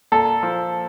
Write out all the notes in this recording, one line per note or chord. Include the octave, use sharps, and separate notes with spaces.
A#2 A4
F3